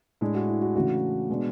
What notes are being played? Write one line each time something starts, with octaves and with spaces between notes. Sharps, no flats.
A2 G#3 D4 E4
F#4
E4
F#4
C#3 E3 A3 D4 F#4
B2 G#3 B3 D4